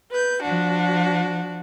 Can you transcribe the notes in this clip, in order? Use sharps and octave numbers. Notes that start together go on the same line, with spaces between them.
B4 G6
F3 D4 F#4